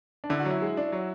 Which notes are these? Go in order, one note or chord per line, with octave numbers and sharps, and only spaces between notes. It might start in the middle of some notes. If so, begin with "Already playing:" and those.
D4
D3 E4
F#4
F#3
E4
G#3
D4
F#3